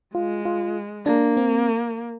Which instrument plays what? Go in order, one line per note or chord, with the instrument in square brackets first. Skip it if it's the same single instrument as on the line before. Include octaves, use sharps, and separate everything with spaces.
[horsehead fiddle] G#3 [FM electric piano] F4
[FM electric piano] F4
[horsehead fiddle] A#3 [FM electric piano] D4
[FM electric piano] C4